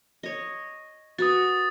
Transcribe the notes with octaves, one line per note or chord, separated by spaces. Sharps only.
C#5 D#5
F#4 B4 D#6 A6